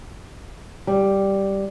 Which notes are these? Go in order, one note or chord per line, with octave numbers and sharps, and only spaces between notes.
G3